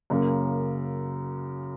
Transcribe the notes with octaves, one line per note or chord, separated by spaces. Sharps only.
F#2 C#3 A#3